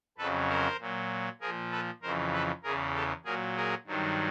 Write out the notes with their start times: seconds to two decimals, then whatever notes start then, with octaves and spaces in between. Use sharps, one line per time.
0.18 F2 C#3 F#3 A4 B4
0.49 A#4 C5
0.80 A#2 F#3
1.41 A#2 F3 G#4 A#4
1.71 A4 B4
2.02 F2 C#3 E3 A#4 C5
2.33 A4 B4
2.63 E2 C#3 E3 G#4 A#4
2.95 G4 A4
3.25 A#2 F#3 G#4 A#4
3.56 G#4 A#4
3.86 G2 D#3 F#3